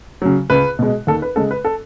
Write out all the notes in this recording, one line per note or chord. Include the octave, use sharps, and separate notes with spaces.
C#3 F#3
C#2 B4
B2 G#3
D#2 A4
B4
C#3 G#3 A4
B4
A4